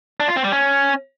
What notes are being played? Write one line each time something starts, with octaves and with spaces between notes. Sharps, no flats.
D4
F4
C4
G3
C#4